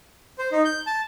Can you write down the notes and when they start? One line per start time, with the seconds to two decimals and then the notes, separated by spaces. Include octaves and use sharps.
0.39 C5
0.52 D#4
0.65 G6
0.87 A5